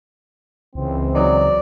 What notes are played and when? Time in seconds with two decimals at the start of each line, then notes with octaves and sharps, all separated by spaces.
0.75 C#2 E3 C4
1.15 F#3 D#4 D5